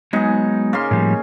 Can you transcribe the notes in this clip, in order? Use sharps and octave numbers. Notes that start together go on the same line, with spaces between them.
F#3 G#3 B3 D#4 G#4
C#3 A#3 C6
A2 F3 G3